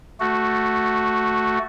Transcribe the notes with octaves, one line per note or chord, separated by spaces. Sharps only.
A3 F#4